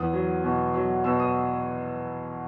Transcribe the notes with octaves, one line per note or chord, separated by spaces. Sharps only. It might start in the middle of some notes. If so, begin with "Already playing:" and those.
Already playing: E2 D#6
F#3
B2
F#3
B2 E6
D#6